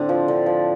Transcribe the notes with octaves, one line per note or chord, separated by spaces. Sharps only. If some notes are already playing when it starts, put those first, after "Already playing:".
Already playing: A2 D3 C4
F3
D3
F3